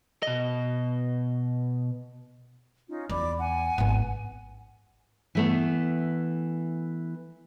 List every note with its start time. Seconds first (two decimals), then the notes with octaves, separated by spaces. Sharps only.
0.23 B2 D#5
2.88 C#4 D#4 F4
3.10 E2 D5 B5 D6
3.38 F#5 G#5
3.78 G#1 B3
5.35 E3 A3 B3